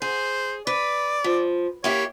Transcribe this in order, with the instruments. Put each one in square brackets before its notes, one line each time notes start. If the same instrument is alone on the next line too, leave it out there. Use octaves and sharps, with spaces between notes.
[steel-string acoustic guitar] G#4 [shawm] C5
[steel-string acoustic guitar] B4 [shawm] D5
[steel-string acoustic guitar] F3
[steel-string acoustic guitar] A#3 E4 G4 [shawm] C#5